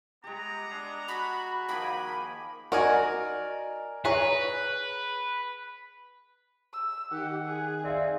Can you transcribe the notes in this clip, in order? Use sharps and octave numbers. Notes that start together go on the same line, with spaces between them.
G#3 B3 G4 A#5
D4 G#4
F#4 B5
D#3 F3 A#3 G5 G#5 B5
D#4 F#4 A#4 D5 G#5
G#4 B4 C#5 A#5
E6
D#3 G4 F#5
G#4
C4 D5 E5 F5